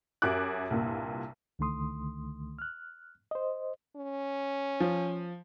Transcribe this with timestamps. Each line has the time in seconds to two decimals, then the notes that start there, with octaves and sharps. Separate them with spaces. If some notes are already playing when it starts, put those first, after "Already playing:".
0.22 F#2 F#4 G4 E5 D6 F#6
0.70 C2 G2 A#2
1.59 C#2 D3 D#3 A3 C6 D#6
2.59 F6 F#6
3.31 C5 D#5
3.96 C#4
4.80 F3